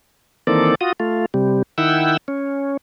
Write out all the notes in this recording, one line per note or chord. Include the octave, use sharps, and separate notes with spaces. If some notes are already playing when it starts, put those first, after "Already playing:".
D#3 E3 A#3 C4 A4 D5
F4 F#4 D#6
A3 F4
C3 G3
D#3 E4 F#5 G5 E6
C#4